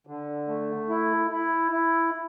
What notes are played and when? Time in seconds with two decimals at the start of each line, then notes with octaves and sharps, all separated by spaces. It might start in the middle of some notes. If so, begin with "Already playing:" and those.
0.07 D3
0.48 A3
0.89 E4
1.31 E4
1.72 E4